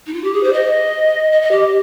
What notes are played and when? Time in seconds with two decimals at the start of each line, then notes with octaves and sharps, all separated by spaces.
0.06 D#4
0.13 F4
0.23 G4
0.33 G#4
0.43 C5
0.53 D#5
1.32 D#5
1.42 D#5
1.51 G4